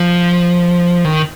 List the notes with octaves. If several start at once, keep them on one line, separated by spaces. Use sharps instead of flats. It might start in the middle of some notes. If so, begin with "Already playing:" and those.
Already playing: F3
D#3